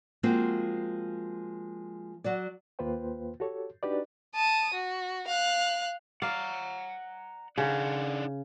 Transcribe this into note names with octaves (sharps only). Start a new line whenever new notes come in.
F3 G#3 A#3 C4 F4 F#4
F#3 F#4 D5
D#2 A#3 F4 B4 C5 G5
F#4 G4 A4 C#5
D4 D#4 F#4 G4 B4 D5
A5 D#6
F#4
F5 F#6
D5 F5 F#5 A#5
C#3 D4 D#4 F#5